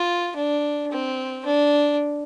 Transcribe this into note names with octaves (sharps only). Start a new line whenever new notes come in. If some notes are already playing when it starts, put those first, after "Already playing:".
Already playing: F4
D4
C4
D4